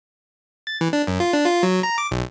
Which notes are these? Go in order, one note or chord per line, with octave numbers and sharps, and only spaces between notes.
A6
E3
D4
F#2
F4
D4
F4
F#3
A#5
D6
B1